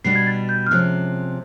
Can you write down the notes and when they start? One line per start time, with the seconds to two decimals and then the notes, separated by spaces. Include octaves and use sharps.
0.04 B2 G3 B3 D4 C7
0.16 G#6
0.27 A6
0.49 G6
0.67 F6
0.71 C3 F3 G#3 C#4 F#6